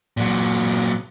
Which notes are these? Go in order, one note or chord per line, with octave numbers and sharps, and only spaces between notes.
A#2 F#3